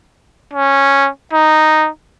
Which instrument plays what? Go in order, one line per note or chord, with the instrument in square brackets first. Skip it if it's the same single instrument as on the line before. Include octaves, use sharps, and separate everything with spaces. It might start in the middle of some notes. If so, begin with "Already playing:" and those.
[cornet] C#4
D#4